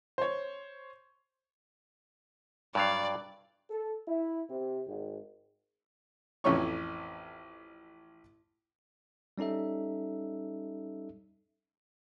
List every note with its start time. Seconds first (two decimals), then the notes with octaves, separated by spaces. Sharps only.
0.18 C5 C#5
2.75 G2 F#3 D5 F5
3.70 A4
4.08 E4
4.49 C3
4.88 G#1
6.44 A1 F2 C#4 C#5 C#6
9.38 G3 C#4 D#4 A4 E5